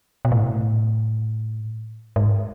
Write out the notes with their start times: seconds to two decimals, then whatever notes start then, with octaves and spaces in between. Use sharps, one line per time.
0.25 B2
0.32 A2
2.16 G#2